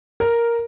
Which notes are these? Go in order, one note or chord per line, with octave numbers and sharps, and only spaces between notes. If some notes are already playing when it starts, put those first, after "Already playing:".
A#4